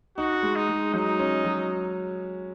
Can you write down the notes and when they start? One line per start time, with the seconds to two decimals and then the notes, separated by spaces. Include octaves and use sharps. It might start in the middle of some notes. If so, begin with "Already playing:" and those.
0.17 D#4 F#4
0.43 G#3
0.56 D#4
0.69 G#3
0.94 F#3 D#4
1.19 C#4
1.44 F#3